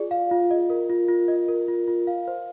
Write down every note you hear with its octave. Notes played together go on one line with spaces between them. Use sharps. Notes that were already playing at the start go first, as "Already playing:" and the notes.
Already playing: F4 G#4 D5
F5
F4
D#5
A#4
F4
F4
D#5
A#4
F4
F4
F5
C5